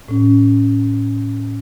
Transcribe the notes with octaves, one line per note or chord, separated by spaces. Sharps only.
A2 C#4